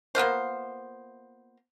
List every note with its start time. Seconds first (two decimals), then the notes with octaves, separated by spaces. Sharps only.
0.15 A#3 B3 F4 C5